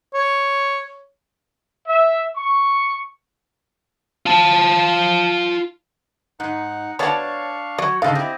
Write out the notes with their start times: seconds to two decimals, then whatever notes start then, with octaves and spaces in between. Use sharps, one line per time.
0.14 C#5
1.88 E5
2.36 C#6
4.26 F4 A5
6.40 G#2 D#4 F#5
6.99 B3 D4 F#4 C#5 D5 F5 A5 C#6
7.78 F#3 C#5 D5
8.02 G#2 C#3 A4 D#5 F5
8.15 C4 E4 G4 D#5